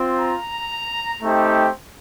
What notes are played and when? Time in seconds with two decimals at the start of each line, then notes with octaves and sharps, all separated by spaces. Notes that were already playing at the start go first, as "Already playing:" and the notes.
Already playing: C4 F4
0.19 A#5
1.21 A3 C4 D#4 G4